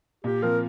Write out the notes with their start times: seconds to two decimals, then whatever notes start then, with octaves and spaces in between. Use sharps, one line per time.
0.24 A#2 G4
0.42 F3 C4 F4 A#4